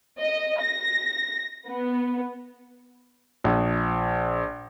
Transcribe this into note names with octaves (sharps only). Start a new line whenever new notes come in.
D#5
A#6
B3
A#1